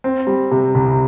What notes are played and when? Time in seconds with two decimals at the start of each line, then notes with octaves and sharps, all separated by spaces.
0.04 C4
0.27 G3
0.51 C3
0.75 C2